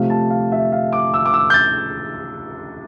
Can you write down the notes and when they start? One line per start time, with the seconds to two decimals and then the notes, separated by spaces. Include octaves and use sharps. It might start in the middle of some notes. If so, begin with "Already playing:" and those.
Already playing: C3 F3 A3 F5
0.10 A5
0.30 F5
0.52 E5
0.72 F5
0.93 D6
1.14 E6
1.26 D6
1.34 E6
1.50 G6
1.54 A6